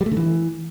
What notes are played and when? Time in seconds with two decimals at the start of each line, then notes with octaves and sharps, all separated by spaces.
0.01 G3
0.06 A3
0.11 D3
0.17 E3